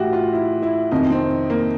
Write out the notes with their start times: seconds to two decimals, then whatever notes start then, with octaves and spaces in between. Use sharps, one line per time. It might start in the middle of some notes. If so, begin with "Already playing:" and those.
Already playing: A2 E3 F#4 G4
0.13 F4
0.33 E4
0.62 E4
0.91 F2 C3 D#3 D#4
1.10 C4
1.50 A#3